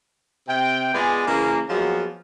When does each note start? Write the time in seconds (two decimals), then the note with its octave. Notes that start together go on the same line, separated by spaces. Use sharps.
0.48 C3 G5
0.94 G#3 B3 F4 G#4 D5
1.27 C#3 E3 G#3 A#3
1.70 F3 F#3 G#3 A#3 B3